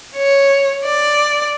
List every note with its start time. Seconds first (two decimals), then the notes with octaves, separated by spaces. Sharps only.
0.16 C#5
0.83 D5